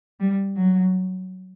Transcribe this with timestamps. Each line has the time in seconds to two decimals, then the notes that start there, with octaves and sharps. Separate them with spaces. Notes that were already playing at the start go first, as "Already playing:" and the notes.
0.20 G3
0.57 F#3